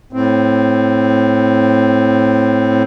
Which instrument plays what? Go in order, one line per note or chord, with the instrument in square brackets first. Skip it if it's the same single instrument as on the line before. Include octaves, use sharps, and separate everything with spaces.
[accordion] A2 C4